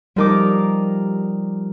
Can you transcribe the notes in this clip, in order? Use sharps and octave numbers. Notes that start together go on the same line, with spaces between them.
F3 G3 D#4 A#4 D6